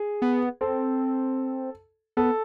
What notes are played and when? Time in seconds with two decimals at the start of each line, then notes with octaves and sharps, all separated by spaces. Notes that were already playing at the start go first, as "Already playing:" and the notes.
Already playing: G#4
0.22 B3
0.61 C4 A4
2.17 B3 A4